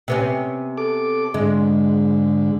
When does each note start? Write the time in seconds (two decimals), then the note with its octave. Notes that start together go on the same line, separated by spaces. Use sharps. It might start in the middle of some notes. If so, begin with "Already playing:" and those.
0.08 C3 B3 C#4
0.78 A4 D6
1.34 G#2 D3 G#3